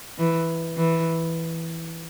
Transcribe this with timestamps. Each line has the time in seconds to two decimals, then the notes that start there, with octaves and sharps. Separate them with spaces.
0.18 E3
0.77 E3